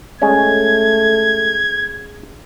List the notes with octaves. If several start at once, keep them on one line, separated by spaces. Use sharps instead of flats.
G#3 A3 C#4 G#6